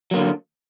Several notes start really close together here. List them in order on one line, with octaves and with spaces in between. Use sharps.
F#3 A#3 D3